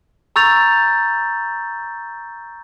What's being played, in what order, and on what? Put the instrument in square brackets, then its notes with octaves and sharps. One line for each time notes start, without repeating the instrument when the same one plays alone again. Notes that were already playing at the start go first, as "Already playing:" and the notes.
[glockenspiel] A#5 C#6 E6 G6 A6 F7